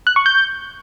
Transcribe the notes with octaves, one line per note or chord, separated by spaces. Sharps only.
F#6
C#6
G6